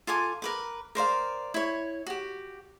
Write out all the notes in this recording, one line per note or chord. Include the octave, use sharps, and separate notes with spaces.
F4 A4 G#5 D6
A#4 B4 D6
A#4 C5 D5 F5
E4 C#5
F#4 G4